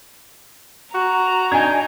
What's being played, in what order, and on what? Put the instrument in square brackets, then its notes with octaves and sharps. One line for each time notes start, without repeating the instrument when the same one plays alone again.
[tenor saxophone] F#4 [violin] A#5
[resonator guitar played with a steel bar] D4 D#4 [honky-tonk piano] G#5 G#6